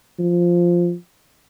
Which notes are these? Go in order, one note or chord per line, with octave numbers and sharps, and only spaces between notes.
F3